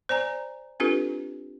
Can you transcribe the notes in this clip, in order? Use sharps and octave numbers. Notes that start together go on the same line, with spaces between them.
C5 D5 G#5 A#5
C4 D4 F4 G4 A4 B4